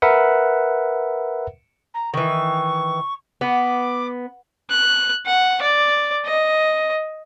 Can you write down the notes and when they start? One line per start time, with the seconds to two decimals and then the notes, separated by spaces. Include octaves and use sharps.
0.02 A#4 B4 E5 F#5
1.94 A#5
2.14 D#3 E3 C#6
3.41 B3 D6
4.70 F#6
5.26 F#5
5.61 D5
6.25 D#5